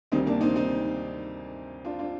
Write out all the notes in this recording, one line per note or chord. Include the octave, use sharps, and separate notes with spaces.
D2 C3 D#3 G3 C4 D#4
A#3 D4
C4 D#4
C4 D#4
D4 F4
D4 F4